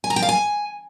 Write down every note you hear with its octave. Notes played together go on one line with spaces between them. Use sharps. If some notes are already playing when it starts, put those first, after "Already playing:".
G#5
A#5
G5
F5
G#5